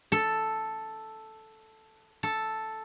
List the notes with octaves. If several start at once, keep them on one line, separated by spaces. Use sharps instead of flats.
A4
A4